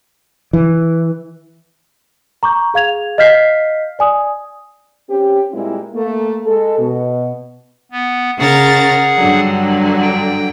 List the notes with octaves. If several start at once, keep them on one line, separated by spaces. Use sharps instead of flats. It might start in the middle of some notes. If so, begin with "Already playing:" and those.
E3
A#5 C#6 D6 G6
G#4 F5 G#6 F7
D#5 F5 F6 G6 B6 C7
D5 G#5 D#6
C4 C#4 G4
A#2 G3 G#3 C4 E4
A3 A#3
G#3 A4
B2
B3
C#3 G#4 A#4 F#5 A6
G2 D3 F#3
G5